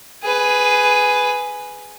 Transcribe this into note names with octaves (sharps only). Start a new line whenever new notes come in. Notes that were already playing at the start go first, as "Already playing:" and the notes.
G#4 B4